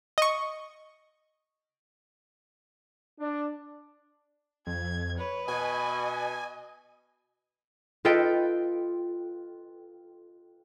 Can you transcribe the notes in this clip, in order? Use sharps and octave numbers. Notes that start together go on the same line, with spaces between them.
D#5 C#6
D4
F2 G#6
B4 C#5
B2 D#5 G#5
F4 A4 B4 D#5 G5